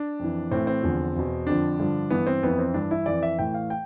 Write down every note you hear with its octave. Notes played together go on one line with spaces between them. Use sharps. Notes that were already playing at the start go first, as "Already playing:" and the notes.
Already playing: D4
F2 E3
A2 E3 C4
C4
E2 D3 F3
E2 B2
F2 D3 F3 D4
G2 D3 F3
G2 E3 B3
C4
F2 E3 B3
C4
G2 E3 D4
E4
F2 E3 D5
E5
A2 E3 G5
F5
G5